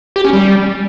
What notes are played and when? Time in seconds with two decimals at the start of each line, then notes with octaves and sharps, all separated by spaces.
0.16 G4
0.25 C#4
0.33 G3